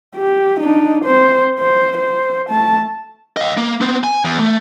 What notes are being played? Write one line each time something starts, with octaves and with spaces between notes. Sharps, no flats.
G4
D4 D#4
C4 C5
C5
C5
A3 A5
D#5 F5
A#3
B3 C4
G#5
E2
A3